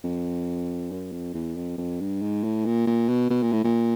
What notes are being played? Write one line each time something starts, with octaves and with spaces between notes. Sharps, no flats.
F2
F#2
F2
E2
F2
F2
G2
G#2
A2
A#2
A#2
B2
B2
A#2
A2
A#2